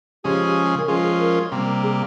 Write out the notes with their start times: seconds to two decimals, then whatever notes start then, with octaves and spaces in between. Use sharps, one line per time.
0.24 C#3 F3 G#3 C#4 G4 G#4
0.78 A#4
0.88 F3 G#3 C#4 F4 G#4
1.04 G#4
1.20 A#4
1.52 C3 G3 A#3
1.83 G#4